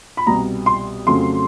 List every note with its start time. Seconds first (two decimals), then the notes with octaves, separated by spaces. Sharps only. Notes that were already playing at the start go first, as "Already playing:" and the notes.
0.17 B5
0.26 C2 B2 G3 B3 A#5
0.66 C6
1.07 F2 C#3 F#3 A3 C6